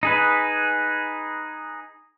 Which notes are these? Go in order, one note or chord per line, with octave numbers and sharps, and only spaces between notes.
D#4 G#4 B4